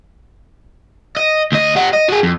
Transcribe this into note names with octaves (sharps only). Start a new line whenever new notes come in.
D#5
D2 D#5
G3 F#5
D#5
F#4 G#4
F2